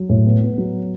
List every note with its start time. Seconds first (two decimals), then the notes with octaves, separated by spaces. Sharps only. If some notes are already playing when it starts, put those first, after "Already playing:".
Already playing: F#3
0.09 A2
0.26 B3
0.42 B3
0.58 F#3